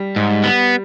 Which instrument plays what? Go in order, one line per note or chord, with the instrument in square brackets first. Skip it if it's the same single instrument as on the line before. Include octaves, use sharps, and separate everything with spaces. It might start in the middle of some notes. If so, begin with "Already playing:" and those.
Already playing: [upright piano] G3
[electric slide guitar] G#2
B3